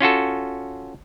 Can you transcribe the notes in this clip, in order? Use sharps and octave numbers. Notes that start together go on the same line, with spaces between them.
C#4 F4 F#4 A4